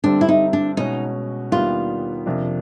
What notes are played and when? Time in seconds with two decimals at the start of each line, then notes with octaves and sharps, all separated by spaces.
0.04 G2 D3 G3 C4 D4
0.21 E4
0.29 D#4
0.53 D4
0.77 B2 G#3 C#4 D#4 F#4
1.51 D#2 D#3 G3 B3 D4 F4
2.26 F2 C3 F3 A#3 D4